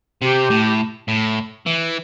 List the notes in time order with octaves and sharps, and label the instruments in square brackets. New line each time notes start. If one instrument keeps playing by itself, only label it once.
[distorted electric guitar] C3 [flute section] G4
[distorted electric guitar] A2
A2
E3